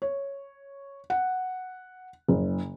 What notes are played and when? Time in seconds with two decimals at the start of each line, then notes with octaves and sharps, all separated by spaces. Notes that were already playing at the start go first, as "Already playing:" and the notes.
0.02 C#5
1.10 F#5
2.28 F#1